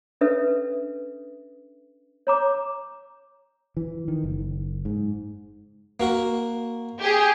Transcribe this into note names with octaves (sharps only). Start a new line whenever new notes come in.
C#4 D4 A4 B4 E5
C#5 A#5 D6
E3
D#3
F#1
G#2
A#3 F#4 A#4
G4 G#4